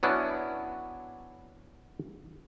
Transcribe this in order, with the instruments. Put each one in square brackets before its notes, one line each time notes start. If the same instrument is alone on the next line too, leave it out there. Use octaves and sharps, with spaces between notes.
[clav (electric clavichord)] F#3 B3 C#4 D4 E4